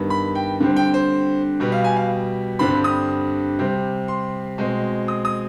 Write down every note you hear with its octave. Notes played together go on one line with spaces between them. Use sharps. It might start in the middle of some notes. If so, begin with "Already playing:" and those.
Already playing: G2 D#3 B3
B5
G5
D3 G3 C4
G5
C5
B2 G3 B3
F5
G#5
F5
G2 D3 G3 C4 B5
D#6
C3 G3 C4
C6
B2 G#3 C4
D#6
D#6